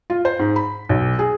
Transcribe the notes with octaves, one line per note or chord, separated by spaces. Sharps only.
F4
C5
G#2
B5
B1
G#4